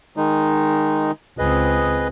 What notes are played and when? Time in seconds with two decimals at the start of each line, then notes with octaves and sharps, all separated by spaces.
0.17 D#3 G#3 D#4
1.38 C#2 C4 G#4 B4 D#5